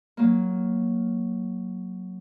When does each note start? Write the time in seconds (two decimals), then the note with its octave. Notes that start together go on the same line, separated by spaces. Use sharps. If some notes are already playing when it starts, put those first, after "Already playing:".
0.17 F#3 A#3